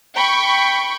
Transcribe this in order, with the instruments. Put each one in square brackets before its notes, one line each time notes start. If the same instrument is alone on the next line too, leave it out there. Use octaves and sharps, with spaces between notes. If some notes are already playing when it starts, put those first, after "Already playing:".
[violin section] G5 B5 C#6